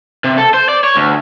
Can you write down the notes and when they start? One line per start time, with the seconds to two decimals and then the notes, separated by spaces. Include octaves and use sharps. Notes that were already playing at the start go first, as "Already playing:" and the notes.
0.24 C3
0.38 A4
0.54 C5
0.69 D5
0.84 C#5
0.96 D2